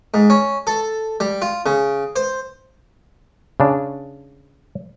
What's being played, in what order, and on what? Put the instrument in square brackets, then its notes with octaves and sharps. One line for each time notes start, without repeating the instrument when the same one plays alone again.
[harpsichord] G#2
C#4
A4
G3
F4
C#3
C5
[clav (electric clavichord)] C#3 D4